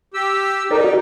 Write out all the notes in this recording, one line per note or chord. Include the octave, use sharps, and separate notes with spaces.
G4 E6
D#4 A4 A#4 D5
F#4 D5